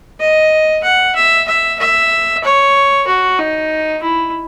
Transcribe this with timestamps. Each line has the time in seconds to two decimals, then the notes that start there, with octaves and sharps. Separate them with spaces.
0.20 D#5
0.84 F#5
1.15 E5
1.48 E5
1.79 E5
2.44 C#5
3.08 F#4
3.39 D#4
4.03 E4